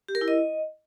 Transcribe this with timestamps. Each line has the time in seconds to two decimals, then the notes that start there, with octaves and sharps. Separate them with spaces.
0.08 G4
0.15 A#4
0.21 E4
0.28 D#5